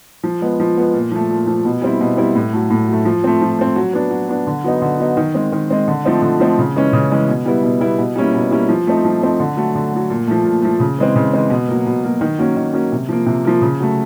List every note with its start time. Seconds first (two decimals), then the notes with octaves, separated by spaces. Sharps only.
0.24 F3
0.42 G#3 B3
0.60 F3
0.77 G#3 B3
0.94 A#2
1.11 F3 A3
1.30 A#2
1.47 F3 A3
1.65 B2
1.82 G3 C4 E4
2.01 B2
2.17 G3 C4 E4
2.36 A2
2.53 F#3 A3
2.70 A2
2.88 F#3 A3
3.05 F3
3.24 A3 C4
3.41 F3
3.59 A3 C4
3.76 F#3
3.93 B3 D4
4.11 F#3
4.29 B3 D4
4.47 D3
4.64 F#3 B3 D#4
4.82 D3
5.00 F#3 B3 D#4
5.17 D#3
5.35 G#3 C4
5.52 D#3
5.70 G#3 C4
5.88 D3
6.04 F3 A3 C4 D#4
6.22 D3
6.40 F3 A3 C4 D#4
6.58 C#3
6.76 E3 G#3 C#4
6.93 C#3
7.11 E3 G#3 C#4
7.28 B2
7.46 G3 B3 E4
7.63 B2
7.81 G3 B3 E4
7.99 B2
8.16 G3 A#3 C#4 E4
8.35 B2
8.51 G3 A#3 C#4 E4
8.69 F3
8.87 A3 C4 D#4
9.05 F3
9.22 A3 C4 D#4
9.40 D3
9.57 F#3 A3
9.75 D3
9.93 F#3 A3
10.10 A#2
10.27 F3 A3
10.45 A#2
10.62 F3 A3
10.80 C#3
10.99 E3 G#3 C4
11.16 C#3
11.33 E3 G#3 C4
11.50 B2
11.68 F#3 A#3
11.86 B2
12.04 F#3 A#3
12.21 D#3
12.39 F#3 A#3 C#4
12.56 D#3
12.73 F#3 A#3 C#4
12.92 C3
13.09 F3 A#3
13.26 C3
13.45 F3 A#3
13.61 C#3
13.80 F#3 A3